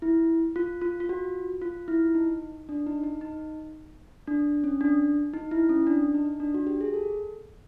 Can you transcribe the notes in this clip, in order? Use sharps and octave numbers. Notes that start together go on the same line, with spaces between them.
E4
F4
F4
F4
F#4
F4
E4
D#4
D4
D#4
D#4
D#4
D4
C#4
D4
D#4
E4
C#4
D4
D#4
D4
F#4
G4
G#4
A4